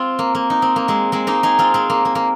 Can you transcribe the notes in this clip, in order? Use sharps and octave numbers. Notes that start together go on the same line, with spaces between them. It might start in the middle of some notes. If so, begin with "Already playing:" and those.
Already playing: C4 F4
A#3
A#3
D#4
C4
A#3
G#3 C4
G#3 C4
A#3 D#4
D#4 G#4
C4 F4
G#3 C4
A#3
A#3
A#3